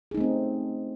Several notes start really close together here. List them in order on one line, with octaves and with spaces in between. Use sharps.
G#4 D#4 A3 C4 C#4